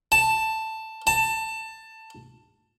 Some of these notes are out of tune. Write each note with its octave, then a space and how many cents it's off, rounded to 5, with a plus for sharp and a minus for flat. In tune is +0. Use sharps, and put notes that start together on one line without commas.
A5 +5
A5 +15